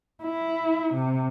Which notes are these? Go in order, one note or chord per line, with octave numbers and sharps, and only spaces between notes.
E4
C3